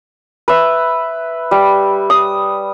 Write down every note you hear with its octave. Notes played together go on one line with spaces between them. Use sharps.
B4 E5
G3
D#6